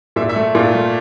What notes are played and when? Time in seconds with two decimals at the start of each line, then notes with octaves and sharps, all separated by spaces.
0.16 A#2 E5
0.29 E5
0.36 A3
0.55 A#2 F4
0.75 A3